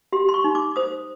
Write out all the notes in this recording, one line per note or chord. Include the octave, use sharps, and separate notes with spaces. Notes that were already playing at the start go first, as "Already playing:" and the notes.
G4 C6
C6
C#6
D#4
D6
C5 D#6